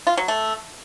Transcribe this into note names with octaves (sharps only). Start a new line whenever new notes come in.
F4
F#3
A3